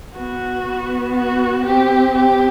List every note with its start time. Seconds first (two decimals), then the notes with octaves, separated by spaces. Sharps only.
0.16 B3 F#4
0.66 B3
1.16 F#4
1.65 C4 G4
2.15 G4